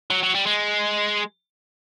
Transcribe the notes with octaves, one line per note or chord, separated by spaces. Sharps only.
F#3
F#3
G3
G#3